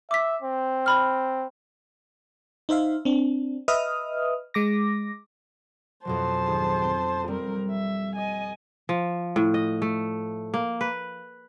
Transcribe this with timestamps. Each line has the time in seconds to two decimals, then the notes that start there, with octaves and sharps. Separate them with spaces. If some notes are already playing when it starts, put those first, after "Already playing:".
0.11 E5 D6 B6
0.43 C4
0.86 B5 F6
2.69 D#4 C5 E5 F5
3.05 C4 D4
3.68 B4 D#5 E5 D#6 F6
4.54 G#3 D6 A#6
6.05 F2 B2 F#3 C5 A5
6.46 G#1 G#4
6.82 C4 G5
7.28 G3 C4 A#4
7.71 E5
8.16 D#5 G#5
8.89 F3
9.36 A2
9.54 D#5
9.82 A3
10.54 A#3
10.81 B4